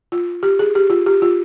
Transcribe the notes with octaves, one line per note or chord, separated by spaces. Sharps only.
F4
G4
G#4
G4
F4
G4
F4